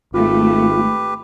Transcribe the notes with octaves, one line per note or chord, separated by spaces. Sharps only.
G#1 A3 F4 G4 B4